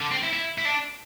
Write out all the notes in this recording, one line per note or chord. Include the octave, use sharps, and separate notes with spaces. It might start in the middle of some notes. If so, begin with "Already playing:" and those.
D3
C4
E4
E4
E4
D4